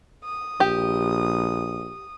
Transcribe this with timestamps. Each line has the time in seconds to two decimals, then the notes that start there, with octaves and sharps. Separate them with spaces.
0.24 D#6
0.60 A#1 G4